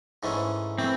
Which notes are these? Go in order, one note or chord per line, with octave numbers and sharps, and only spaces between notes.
G#2 E3 A3 C#4
E3 A3 C4